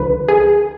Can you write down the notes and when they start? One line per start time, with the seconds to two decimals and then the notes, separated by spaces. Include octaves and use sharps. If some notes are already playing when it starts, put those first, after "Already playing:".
Already playing: D2 D3 F3 B4
0.28 G#4